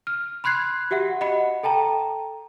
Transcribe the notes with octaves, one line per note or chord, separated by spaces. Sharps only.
F6
B5 C6 F#6 G#6 C7
F#4 G4 E5 F#5
D#5 F#5 B5 C#7
A4 G5 A5 A#5